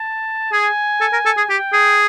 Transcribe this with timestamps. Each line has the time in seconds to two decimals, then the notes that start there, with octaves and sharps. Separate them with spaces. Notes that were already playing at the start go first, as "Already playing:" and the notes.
Already playing: A5
0.52 G#4 G#5
1.01 A4
1.13 A#4
1.26 A4
1.37 G#4
1.49 G4 G5
1.73 G#4